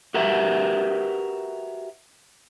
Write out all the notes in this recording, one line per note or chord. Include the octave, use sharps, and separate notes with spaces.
F#4 G4 A#4 B4 E5